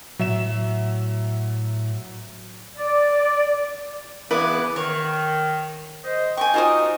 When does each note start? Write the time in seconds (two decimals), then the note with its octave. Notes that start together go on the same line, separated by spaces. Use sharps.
0.19 A2 F#3 E5 E7
2.74 D5
4.31 C#3 E3 B3 E4 B4 D5
4.76 D#3 C#5
6.04 C5 D#5
6.37 G5 G#5 C#6
6.54 D#4 F4 F#4 C5 D#5 D#6